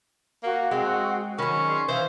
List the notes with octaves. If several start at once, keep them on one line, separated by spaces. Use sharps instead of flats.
A#3 F#4
G#3 C4
D#3 F#3 C#4 B5
G#4 D5 C6
E3 C5 E5 F5